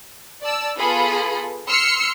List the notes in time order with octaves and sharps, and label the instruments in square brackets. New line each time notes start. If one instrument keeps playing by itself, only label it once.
[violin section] D5 A5 E6
B3 F4 G#4 A4 B4 B5
C6 E6 F6 C7 C#7